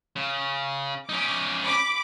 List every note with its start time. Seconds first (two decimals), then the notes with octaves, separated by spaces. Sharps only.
0.16 C#3
1.09 C#4 D#4 D6
1.66 B5 D6